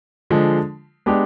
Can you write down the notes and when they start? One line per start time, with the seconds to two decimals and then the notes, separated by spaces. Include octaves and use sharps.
0.30 D3 F3 G#3
1.06 G#3 B3 D4 G4